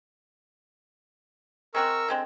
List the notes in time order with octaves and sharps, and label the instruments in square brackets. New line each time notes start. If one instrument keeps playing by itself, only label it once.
[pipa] G#3 C4 F#4 [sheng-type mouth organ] A#4 C#6 E6
[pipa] D3 G#3 C4